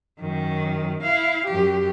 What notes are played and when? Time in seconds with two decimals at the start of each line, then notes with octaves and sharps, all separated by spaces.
0.20 F#2 D#3
1.03 E4 F5
1.46 F#2 G4